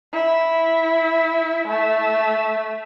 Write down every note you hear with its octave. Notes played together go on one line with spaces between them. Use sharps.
E4
A3